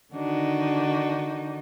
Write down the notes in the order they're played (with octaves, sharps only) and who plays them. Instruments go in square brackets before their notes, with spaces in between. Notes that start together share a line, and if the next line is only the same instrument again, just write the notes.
[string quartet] D3 D#3 D4 D#4 F#4